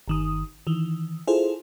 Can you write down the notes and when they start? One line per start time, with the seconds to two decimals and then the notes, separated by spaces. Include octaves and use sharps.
0.08 G1 D#3 D#6
0.67 D#3 E3
1.27 E4 F4 G#4 A4 C5